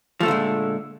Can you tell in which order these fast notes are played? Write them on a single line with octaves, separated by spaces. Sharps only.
F3 A3 D3 A#2 G#3